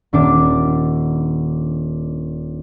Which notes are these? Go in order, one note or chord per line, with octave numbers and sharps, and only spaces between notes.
D#1 D4 D6